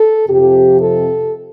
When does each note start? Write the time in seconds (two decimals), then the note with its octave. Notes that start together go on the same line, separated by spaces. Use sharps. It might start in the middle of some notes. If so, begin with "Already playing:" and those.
Already playing: A4
0.28 F2 C3 F3 G4
0.80 A4